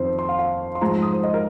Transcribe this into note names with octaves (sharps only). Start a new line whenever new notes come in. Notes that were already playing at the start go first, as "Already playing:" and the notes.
Already playing: F2 D#3 C5
C6
F5
F5
C6
G#2 F3 A#5
C6
D#6
C5
D#5
A#4